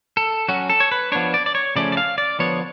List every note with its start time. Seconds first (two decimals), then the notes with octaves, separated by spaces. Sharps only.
0.17 A4
0.48 F#3 C#4 F#4
0.70 A4
0.80 C#5
0.92 B4
1.12 F3 B3 D4 C#5
1.34 D5
1.46 D5
1.55 C#5
1.76 C#3 F3 A3 C#4 D5
1.92 D5
1.97 F5
2.18 D5
2.39 D3 F3 B3 D4 C#5